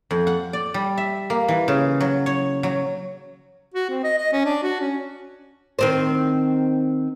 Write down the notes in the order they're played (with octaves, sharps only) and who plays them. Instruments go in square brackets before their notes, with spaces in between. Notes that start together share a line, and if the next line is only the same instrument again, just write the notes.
[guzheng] F2
F#5
D5
G3
E5
A#3
E3
C#3
F#3
C#5
F#3
[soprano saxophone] F#4
C4
D#5
D#5
C#4
D4
F#4
C#4
[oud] D#3 C4 C5